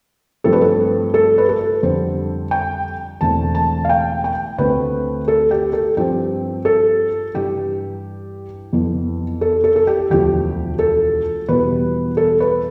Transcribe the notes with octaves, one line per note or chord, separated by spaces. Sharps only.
G2 F3 A3 C4 A4
B4
A4
A4
B4
A4
F2 D3 G3 C4 C5
G5
E1 E2 D3 A3 C4 A5
A5
F5
G5
G5
D2 D3 A3 C4 B4
A4
G4
A4
G2 F3 C4 G4
A4
G2 E3 G3 G4
F2 E3 B3
A4
A4
A4
G4
E1 D2 D3 F3 G4
A4
E2 B2 G3 B4
A4
B4